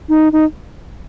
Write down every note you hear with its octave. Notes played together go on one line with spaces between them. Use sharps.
D#4
D#4